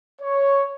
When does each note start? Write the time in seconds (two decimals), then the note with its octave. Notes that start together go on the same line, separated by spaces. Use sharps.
0.22 C#5